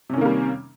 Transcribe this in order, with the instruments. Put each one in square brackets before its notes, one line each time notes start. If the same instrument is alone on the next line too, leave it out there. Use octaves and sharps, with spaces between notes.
[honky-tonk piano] C3
C#4
D#3
A#3
G3